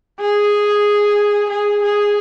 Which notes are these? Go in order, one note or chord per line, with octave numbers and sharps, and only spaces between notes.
G#4
G#4
G#4